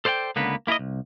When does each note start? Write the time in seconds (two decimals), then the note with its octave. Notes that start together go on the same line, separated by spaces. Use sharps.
0.05 A4 C5 D5 F#5 G5
0.36 C#2 D3 A#3 B3 B4
0.67 A#3 E4 G4 A#4 D#5
0.79 C2